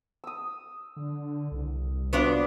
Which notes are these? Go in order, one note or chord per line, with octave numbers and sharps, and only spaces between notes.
D#6 E6
D3
C2
F3 B3 D4 F#4 D5